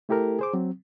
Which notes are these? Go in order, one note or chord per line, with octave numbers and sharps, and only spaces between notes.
A3 E4 G4 A4 A#4
G#4 C5 D6
F#3 C4